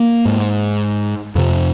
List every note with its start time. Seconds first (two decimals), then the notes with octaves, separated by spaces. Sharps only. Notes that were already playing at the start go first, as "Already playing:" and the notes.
Already playing: A#3
0.25 G#2
1.35 F2 C3